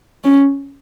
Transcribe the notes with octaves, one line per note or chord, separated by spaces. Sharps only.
C#4